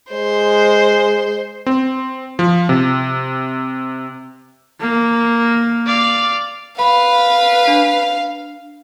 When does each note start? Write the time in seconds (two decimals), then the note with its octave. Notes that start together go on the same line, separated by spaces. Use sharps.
0.12 G#3 C5
1.66 C4
2.39 F3
2.69 C3
4.80 A#3
5.86 D5 F5
6.79 B4 F5 B5
7.68 D4